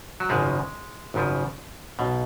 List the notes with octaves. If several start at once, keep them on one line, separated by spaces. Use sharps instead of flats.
F#3
G#1 F#2 C#3 F3 G#3
G#1 F#2 C#3 F3
B1 B2